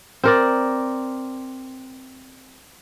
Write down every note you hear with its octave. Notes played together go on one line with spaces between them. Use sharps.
C4 A#4 D5